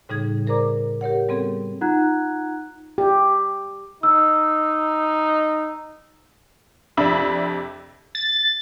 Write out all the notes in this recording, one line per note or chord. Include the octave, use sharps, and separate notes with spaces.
A2 C#3 G3 D#4 G#4 G#6
G#4 A#4 C5 D5 A#5 D6
G4 A#4 C#5 F#5
G3 B3 C4 G#4 A4
D#4 F4 F#5 A#5 F#6 G#6
G4
D#4 E6
F2 C3 D4 E5 B5 E6
A6